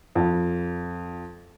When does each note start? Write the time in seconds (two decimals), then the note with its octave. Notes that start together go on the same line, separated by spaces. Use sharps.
0.15 F2